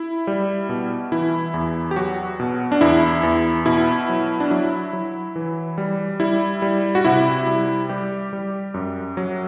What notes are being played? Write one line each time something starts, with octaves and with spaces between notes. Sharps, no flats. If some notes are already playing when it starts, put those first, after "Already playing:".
Already playing: E4
G3
B2
E3 E4
E2
G4
F#3 F#4
B2
D4
E2 E4
E2
B2 E4
F#3
D4
F#3 E4
F#3
E3
G3
G3 E4
G3
F#4
C3 E4
G3
G3 G4
G3
F#2
F#3